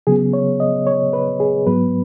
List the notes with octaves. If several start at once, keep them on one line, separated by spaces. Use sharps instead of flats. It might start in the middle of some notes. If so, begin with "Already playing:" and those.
C#3 F#3 B3 G#4
C#5
D#5
C#5
B4
G#4
G#2 F#3 B3 B4